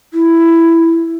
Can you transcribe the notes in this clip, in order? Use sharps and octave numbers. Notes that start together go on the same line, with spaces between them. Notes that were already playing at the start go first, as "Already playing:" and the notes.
E4